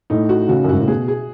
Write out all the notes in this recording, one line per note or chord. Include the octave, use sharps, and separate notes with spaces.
A2 D#4
F#4
C#3 F#4
F#2
G#2 F#4
A2
B2 G#4
G#4